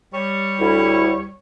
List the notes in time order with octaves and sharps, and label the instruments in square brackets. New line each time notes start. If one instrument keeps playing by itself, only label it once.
[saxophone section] G3 C#5
[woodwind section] D2 E4